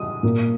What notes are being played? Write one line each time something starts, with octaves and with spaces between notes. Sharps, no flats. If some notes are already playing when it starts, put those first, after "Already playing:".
Already playing: D#6
A#2 A#3